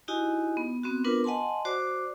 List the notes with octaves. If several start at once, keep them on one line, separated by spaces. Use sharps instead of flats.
D#4 E4 F#4 G4 D#5 G#5
B3
B3 C4 F#4
B3 D4 F4 A#4 B4
D#5 F#5 G#5 A5 C6
F#4 C5 D5 D6